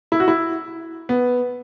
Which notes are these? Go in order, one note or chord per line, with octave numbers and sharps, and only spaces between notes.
E4
F#4
E4
B3